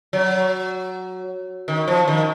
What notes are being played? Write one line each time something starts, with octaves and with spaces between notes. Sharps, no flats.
F#3
D#3
F3
D#3